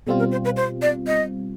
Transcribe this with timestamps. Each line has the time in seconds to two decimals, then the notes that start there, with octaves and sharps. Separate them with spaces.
0.07 B2 G3 C4 F4 A4
0.19 A#4
0.31 C5
0.45 B4
0.57 C5
0.82 D5
1.07 D#5